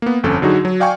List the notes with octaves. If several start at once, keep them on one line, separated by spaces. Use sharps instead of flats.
A#3 B3
G1 F2 C#4 A4
D3 F#3 D#4 F#4 G#4
F#3
D5 F5 G5 G#5 C#6